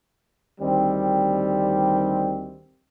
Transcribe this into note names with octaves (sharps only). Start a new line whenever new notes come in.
D2 D#3 G3 C4